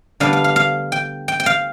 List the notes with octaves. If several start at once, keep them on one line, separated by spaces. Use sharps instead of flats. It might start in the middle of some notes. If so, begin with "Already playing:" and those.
D3 G3 B3 D4 F5
F5
F5
F5
G5
G5
G5
F5